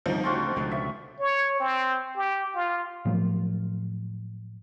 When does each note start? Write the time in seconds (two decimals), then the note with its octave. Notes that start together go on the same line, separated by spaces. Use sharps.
0.06 G1 C2 F3 D#4
0.24 D2 C#3 C4 F4 F#4
0.56 C#2 B2 D3
0.71 E5
1.20 C#5
1.60 C4
2.16 G4
2.55 F4
3.05 A2 F3 F#3